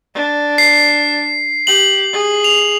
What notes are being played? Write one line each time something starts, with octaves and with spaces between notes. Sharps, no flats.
D4
C7
G4 F#7
G#4
F7